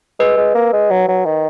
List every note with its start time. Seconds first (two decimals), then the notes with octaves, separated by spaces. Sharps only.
0.19 G#3 B4
0.37 G#3
0.55 A#3
0.73 G#3
0.90 F#3
1.08 F#3
1.25 D#3